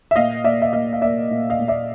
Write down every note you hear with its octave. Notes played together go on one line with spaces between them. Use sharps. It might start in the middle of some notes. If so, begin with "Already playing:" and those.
E5
A#2 D#5 F5
A#3 D5 E5
E5
A#3 D#5 F5
F5
A#3 D5 E5
A#2
D#5 F5
A#2
D5 E5